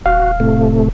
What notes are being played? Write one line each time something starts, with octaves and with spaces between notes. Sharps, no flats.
D#1 F#4 F5
A2 C3 A3